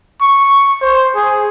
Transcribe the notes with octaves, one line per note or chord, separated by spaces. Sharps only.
C#6
C5
G#4